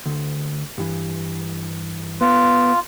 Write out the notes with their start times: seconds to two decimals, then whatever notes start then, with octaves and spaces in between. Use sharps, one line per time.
0.06 D2
0.78 G2 E3
2.21 B3 F4